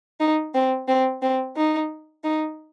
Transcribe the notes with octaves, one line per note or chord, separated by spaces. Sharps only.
D#4
C4
C4
C4
D#4
D#4